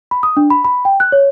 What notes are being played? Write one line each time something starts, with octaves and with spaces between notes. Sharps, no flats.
B5
D#6
D4
B5
B5
G5
F#6
C#5